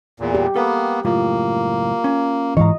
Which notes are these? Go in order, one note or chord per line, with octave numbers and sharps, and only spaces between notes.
E2 A#2
G4
A#3 B3 A4 B4
C#2 F#2 A2 A#3 F4
C#4
G#2 E3 C#5 D#5 F5 A#5